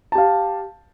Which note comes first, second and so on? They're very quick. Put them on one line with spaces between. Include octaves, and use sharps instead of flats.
A5 G4 F5